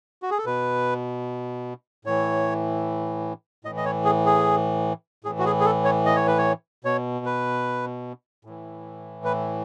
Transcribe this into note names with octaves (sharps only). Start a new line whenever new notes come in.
F#4
G#4
A4
B2 B4
A2 E3 C#5
A2 E3 D#5
D#5
C#5
G#4
G#4
A2 E3 G#4
F#4
G#4
G#4
A4
C#5
D#5
C#5
B4
C#5
B2 C#5
B4
A2 E3
B4